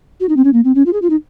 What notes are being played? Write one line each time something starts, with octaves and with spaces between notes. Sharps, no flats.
F#4
D#4
C4
C#4
A#3
C4
C#4
F4
G#4
F4
D#4